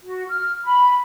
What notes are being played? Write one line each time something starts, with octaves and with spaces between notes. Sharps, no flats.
F#4
F6
B5